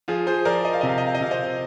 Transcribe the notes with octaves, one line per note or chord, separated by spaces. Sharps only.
F3 F4 G#4
G#4 C5
F3 A#4 D5
D#5
F5
C3 D#5
F5
D#5
F5
D#5
C3 F5
C5 D#5